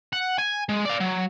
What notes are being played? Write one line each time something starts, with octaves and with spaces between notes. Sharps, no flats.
F#5
G#5
G#3
D5 F5
F#3